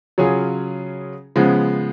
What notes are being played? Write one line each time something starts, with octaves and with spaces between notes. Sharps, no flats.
C#3 F#3 C#4 F4 G#4
C#3 F3 G#3 B3